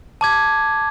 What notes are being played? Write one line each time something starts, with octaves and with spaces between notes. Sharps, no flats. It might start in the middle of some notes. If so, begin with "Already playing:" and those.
A5 D6 G#6